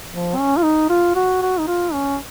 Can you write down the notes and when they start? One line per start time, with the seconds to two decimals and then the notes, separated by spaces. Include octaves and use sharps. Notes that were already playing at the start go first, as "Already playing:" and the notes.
0.11 F3
0.37 C#4
0.57 F4
0.63 D#4
0.89 F4
1.15 F#4
1.42 F#4
1.59 D#4
1.68 F4
1.93 C#4